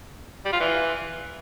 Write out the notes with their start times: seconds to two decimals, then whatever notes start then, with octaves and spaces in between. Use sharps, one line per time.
0.45 G3
0.53 F4
0.60 E3